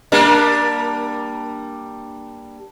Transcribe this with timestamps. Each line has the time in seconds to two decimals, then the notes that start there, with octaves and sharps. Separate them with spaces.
0.12 G3 A#3 D4